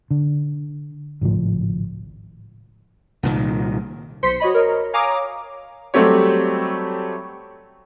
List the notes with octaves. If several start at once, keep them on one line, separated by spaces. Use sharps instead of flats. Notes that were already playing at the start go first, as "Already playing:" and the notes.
D3
G#1 C#2 A2 F3
C2 A#2 D#3
B1 C5 C6 B6 C#7
F#4 C#5 D#5 B5
A#4 C#5 D#5
C#5 F5 G#5 A#5 D6 D#6
F#3 G3 A3 C4 G4 C#5